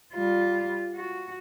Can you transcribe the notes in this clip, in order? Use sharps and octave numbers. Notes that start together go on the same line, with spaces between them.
G3 F4
F#4